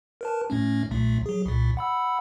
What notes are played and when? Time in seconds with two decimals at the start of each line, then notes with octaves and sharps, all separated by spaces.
0.21 A#4 B4 A5
0.50 A2 A3 C#4
0.91 B1 A#2 A3
1.26 F#3 G#4
1.46 C2 A#2
1.77 F#5 B5 E6